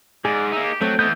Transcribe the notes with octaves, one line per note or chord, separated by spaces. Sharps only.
G#2 G#4 D5
A#3 D#4 E5
G4
F#3 A3 C4 G5
E3 B3 D#5 G6